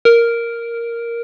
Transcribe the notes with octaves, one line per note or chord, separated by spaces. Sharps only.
A#4